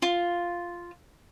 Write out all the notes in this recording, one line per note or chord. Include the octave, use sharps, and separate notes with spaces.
F4